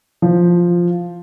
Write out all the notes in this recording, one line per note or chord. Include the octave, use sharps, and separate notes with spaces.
F3